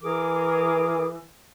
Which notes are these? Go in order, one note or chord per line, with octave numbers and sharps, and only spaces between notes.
E3 G#4 A#4 D6